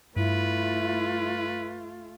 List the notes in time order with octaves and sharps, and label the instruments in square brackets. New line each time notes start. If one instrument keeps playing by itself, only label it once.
[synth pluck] G2 [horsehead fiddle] A3 F4 [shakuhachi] E4 [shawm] B4